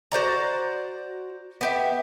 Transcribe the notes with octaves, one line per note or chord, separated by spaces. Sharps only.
F#4 C5 D5 A#5
B3 G4 E5